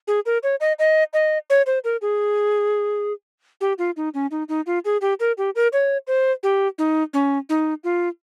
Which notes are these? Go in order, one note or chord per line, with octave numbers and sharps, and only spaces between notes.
G#4
A#4
C#5
D#5
D#5
D#5
C#5
C5
A#4
G#4
G4
F4
D#4
C#4
D#4
D#4
F4
G#4
G4
A#4
G4
A#4
C#5
C5
G4
D#4
C#4
D#4
F4